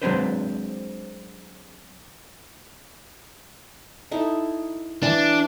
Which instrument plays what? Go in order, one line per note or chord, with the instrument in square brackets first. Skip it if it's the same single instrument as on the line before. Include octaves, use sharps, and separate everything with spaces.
[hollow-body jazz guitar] F#3 G#3 C4 D4 B4 C5
[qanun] D#4 E4 A4
[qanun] E3 [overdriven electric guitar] D4